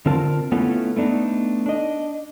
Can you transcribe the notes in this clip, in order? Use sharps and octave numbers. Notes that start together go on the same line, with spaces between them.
D3 C4 F4 A#4 A5
A3 B3 C#4 E4 F4 A4
A3 B3 D4 D#4
D4 D#5